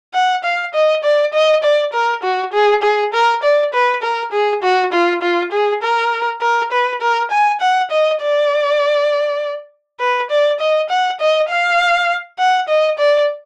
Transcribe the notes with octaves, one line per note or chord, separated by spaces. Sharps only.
F#5
F5
D#5
D5
D#5
D5
A#4
F#4
G#4
G#4
A#4
D5
B4
A#4
G#4
F#4
F4
F4
G#4
A#4
A#4
B4
A#4
G#5
F#5
D#5
D5
B4
D5
D#5
F#5
D#5
F5
F#5
D#5
D5